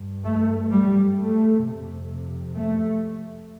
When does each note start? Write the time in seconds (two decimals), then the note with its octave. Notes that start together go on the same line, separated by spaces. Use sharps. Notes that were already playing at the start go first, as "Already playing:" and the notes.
Already playing: G2
0.24 A3
0.71 G3
1.17 A3
1.63 F2 C3
2.56 A3